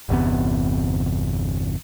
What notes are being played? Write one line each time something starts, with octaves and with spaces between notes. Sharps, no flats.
G1 E2 C3 B3